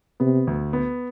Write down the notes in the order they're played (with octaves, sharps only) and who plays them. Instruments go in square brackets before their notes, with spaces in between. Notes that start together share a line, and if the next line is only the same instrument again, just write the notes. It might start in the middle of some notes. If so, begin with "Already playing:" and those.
[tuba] C3 [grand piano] B3
[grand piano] D2
B3